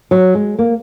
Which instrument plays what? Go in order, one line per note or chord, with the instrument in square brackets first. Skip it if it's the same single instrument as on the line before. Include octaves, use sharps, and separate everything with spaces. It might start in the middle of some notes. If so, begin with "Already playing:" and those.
[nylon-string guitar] F#3
G#3
A#3